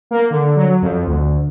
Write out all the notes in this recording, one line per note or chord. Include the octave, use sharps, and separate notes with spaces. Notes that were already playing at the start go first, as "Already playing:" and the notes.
A#3
D3
F#3
F2
D2